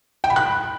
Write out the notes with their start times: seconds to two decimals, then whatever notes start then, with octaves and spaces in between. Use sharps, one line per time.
0.24 G5
0.30 B5
0.36 F#6